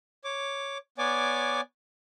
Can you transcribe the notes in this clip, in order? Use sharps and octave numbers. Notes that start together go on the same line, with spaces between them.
C#5 D6
B3 C#5 D5 G#5 D6